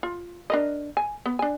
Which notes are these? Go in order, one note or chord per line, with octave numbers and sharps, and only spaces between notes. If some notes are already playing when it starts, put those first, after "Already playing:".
F4
D4 A#4 D#5
G#5
B3
D4 G#5